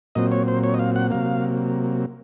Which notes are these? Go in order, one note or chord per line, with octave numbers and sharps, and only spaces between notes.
A#2 F#3 C4 D#5
C#5
C5
C#5
D#5
F5
F#5
C3 F#3 A#3 F5